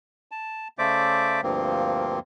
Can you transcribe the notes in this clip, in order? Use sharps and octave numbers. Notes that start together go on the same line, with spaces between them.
A5
C#3 A3 C5 D5 E5 D6
D2 G2 F3 A#3 C4